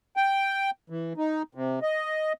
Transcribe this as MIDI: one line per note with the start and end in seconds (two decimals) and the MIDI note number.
0.17 0.70 79
0.90 1.13 52
1.17 1.42 63
1.55 1.79 48
1.82 2.33 75